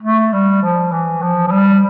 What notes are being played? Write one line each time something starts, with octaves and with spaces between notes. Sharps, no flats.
A3
G3
F3
E3
F3
F3
G3